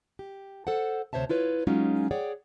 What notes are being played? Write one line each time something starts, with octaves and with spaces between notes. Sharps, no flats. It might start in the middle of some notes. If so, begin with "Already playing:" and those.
G4
A4 C5 F#5
D2 C3 C5 C#5 E5 A5
E4 F4 B4 C#5
F#3 G#3 C#4 D#4 F4
G#4 C#5 D5 F#5 G5